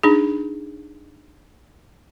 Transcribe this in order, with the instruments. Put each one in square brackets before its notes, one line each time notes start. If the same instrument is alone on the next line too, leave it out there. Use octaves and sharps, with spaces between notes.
[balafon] D4 D#4 G#4